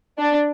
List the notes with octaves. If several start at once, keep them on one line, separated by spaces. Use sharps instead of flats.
D4